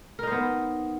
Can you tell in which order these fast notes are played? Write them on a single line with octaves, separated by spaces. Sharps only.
A#4 D#4 C5 B3